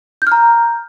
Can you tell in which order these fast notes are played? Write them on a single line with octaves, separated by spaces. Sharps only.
G6 F6 A#5